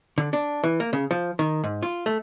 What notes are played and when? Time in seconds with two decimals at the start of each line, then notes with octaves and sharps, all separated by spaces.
0.18 D3
0.33 D4
0.64 E3
0.80 A#3
0.93 C#3
1.11 F3
1.39 D#3
1.64 G#2
1.83 F4
2.06 A3